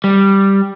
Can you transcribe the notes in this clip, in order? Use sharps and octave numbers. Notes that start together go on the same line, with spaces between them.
G3